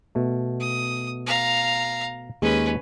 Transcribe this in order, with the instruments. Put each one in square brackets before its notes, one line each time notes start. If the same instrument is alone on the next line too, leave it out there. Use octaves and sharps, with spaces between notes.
[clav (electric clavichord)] B2 A3
[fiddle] D#6
F5 A#5
[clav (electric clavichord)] D#2 G#3 G#4 [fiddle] C#4 B4